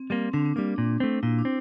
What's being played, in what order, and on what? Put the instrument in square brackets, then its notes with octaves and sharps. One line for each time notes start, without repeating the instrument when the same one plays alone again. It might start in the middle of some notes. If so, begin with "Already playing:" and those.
Already playing: [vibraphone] C4
[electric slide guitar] G3 A#3 [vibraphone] C4
[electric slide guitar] D3 [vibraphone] D4
[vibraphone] C4
[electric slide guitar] G3 A#3 [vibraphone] D4
[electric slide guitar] A#2
A3 C4
[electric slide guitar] A#2 [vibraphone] E4
[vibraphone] D4
[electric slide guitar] C4